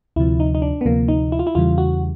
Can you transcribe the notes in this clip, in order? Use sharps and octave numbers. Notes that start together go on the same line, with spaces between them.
D2 C3 F3 E4
D#4
D#4
D4
B3
D2 C3 F3 A#3
D#4
E4
F4
E4
E2 C#3 E3 G3 F4
F#4